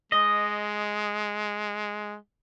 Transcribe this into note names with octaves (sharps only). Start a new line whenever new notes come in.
G#3 D#5